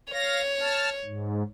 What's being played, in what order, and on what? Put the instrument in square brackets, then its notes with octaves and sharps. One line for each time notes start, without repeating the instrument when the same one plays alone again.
[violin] C#5 [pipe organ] F5 A#6
[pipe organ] A5 F6
G#2